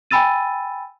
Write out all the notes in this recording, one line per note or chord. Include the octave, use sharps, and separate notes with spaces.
G5 G#5 B5 E6 A6 D#7